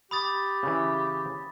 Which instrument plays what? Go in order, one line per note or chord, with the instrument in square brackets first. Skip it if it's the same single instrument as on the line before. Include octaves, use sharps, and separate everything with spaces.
[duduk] G4 [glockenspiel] B5 D#6 A6
[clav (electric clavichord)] C#3 E3